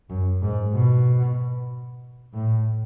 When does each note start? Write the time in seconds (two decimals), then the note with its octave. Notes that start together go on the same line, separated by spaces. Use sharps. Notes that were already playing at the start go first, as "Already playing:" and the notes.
0.10 F#2
0.42 G#2
0.75 B2
2.34 A2